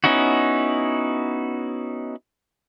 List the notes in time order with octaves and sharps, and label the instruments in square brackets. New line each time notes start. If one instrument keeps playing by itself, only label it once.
[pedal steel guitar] B3 C#4 D#4 E4 F#4